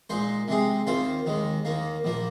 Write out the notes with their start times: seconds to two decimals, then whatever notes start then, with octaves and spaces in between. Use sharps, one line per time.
0.10 A#2 G#3 D#4 C5
0.48 C3 G#3 C4 G#4
0.87 D#2 D#3 C4 F4 C5
1.26 D#2 D#3 G#3
1.65 D#2 D#3 A#3
2.04 A#1 F3 A#3